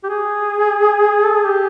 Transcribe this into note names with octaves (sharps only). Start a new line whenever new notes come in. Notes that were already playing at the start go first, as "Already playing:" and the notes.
G4
G#4
A4
G#4
G4